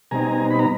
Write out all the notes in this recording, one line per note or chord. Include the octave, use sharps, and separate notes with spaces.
B2 G3 C4 D#4 G#5 A#5
B5
A#5